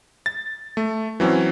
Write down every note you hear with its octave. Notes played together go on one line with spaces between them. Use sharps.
A6
A3
E3 F#3 C4 C#4